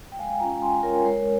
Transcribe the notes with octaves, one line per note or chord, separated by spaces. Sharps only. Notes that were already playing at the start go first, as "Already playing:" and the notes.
G5
G#3 F5 G#5
C#4 F4 G5 A#5
G#3 G#5 C6
C#4 F4 A#4 C#5
G#3 A#4 C#5